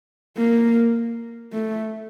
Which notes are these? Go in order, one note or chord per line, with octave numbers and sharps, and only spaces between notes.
A#3
A3